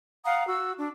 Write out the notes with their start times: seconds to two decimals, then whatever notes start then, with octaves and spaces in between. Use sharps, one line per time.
0.25 F5 F#5 A#5 D#6
0.47 F#4 E6
0.79 D4